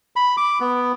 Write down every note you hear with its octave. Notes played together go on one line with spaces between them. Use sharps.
B5
D6
B3